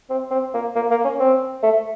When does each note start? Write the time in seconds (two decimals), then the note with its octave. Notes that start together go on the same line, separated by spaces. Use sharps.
0.10 C4
0.31 C4
0.54 A#3
0.75 A#3
0.91 A#3
1.04 C#4
1.19 C4
1.63 A3